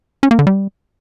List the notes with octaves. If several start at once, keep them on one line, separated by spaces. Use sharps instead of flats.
C#4
A#3
D3
G3